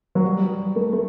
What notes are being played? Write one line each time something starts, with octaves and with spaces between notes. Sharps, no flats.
F#3
G3
A3
A3